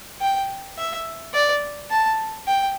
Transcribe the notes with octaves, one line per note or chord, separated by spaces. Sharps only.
G5
E5
D5
A5
G5